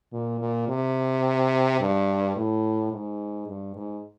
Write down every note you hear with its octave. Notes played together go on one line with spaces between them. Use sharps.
A#2
A#2
C3
G2
A2
G#2
G2
G#2